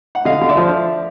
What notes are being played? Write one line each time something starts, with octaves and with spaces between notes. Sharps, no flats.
F#5
D3 D#5 F5
D3
D5 E5
F3